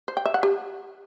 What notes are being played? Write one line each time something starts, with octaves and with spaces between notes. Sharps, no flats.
C5
G5
E5
F#5
G4